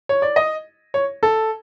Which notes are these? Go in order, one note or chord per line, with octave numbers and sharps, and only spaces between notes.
C#5
D5
D#5
C#5
A4